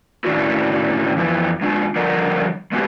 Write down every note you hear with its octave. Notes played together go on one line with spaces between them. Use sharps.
A2 D#3 C#4 D4 E4 F#4
F2 E3
G#3 D4 F4
D3 F3 G3 A#4 D#5 F#5
G#3 B3 C4 F#4 G4